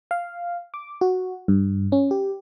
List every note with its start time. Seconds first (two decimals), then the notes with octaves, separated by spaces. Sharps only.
0.11 F5
0.74 D6
1.01 F#4
1.48 G2
1.92 C#4
2.11 G4